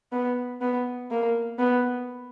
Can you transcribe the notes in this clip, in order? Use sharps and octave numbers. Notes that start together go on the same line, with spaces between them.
B3
B3
A#3
B3